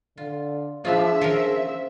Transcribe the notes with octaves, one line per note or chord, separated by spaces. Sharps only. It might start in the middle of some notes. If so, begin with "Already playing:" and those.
D3 F4
F3 D4 E4 F4 G#4 E5
F3 C#4 A#4 C5